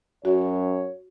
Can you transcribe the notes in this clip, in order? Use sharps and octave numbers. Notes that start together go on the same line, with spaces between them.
F#2 F#4 C#5